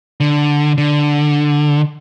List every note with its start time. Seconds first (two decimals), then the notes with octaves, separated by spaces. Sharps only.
0.20 D3
0.78 D3